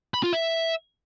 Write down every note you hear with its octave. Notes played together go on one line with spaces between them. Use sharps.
B5
F4
E5